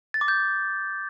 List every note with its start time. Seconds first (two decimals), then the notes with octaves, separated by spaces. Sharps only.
0.14 A6
0.21 D6
0.28 G6